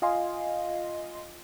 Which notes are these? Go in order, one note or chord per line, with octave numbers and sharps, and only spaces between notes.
F4 D#5 F5 G#5 C6